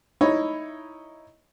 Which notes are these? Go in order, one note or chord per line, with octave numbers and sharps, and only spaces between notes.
D#4 E4 C#5